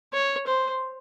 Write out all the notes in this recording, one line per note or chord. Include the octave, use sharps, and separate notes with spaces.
C#5
C5